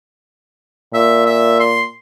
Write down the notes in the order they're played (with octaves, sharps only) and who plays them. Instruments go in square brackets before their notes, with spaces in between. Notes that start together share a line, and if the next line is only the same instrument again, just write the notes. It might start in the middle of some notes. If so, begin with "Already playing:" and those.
[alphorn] A#2 [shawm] E5
[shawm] E5
C6